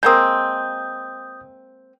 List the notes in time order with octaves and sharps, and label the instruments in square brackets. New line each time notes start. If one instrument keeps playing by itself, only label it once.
[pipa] G#3 A#3 C4 [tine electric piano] D#6 G6